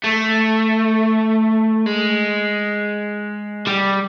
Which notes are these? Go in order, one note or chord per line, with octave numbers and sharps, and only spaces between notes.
A3
G#3
G3